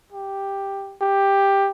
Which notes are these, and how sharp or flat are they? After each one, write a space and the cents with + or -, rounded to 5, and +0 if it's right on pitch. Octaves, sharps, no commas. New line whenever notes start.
G4 +5
G4 +10